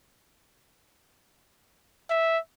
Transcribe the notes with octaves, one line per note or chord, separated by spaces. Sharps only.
E5